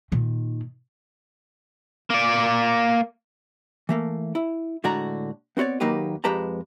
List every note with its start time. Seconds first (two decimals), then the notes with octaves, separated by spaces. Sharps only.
0.12 A#2 D#3
2.10 A#3 D5
3.89 E3 A3 A#3
4.35 E4
4.84 A2 D3 G#3 F#4 D5 A#5
5.57 B3 C4 F#4 C#5 D5
5.80 D#2 F#3 A#3 D#4 G4 B4
6.24 F2 G#3 G4 B4 A5 A#5